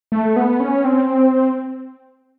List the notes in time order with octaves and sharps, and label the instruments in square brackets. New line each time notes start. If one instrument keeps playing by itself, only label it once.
[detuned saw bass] A3
B3
C#4
C4